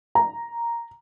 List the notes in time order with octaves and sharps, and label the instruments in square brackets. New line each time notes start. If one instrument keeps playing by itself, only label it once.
[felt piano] A#5